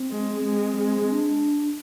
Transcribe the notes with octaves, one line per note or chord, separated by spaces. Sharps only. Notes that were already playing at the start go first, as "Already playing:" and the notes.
Already playing: C4
G#3
G#3 C4
G#3
D4